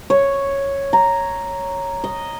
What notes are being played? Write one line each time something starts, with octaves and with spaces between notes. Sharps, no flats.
C#5
A#5
D#5